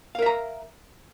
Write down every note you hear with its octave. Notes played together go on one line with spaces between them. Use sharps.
A#4 E5 F5 A#5